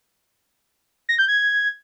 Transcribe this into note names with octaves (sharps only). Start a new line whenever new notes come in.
A#6
G6
G#6